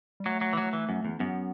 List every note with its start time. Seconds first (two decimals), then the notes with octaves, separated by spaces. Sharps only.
0.20 G3
0.25 F#3 A3
0.41 F#3
0.53 E3
0.57 F#3
0.73 E3
0.89 F#2
1.05 E2
1.20 F#2 B3